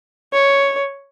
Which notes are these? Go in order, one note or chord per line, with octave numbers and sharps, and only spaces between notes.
C#5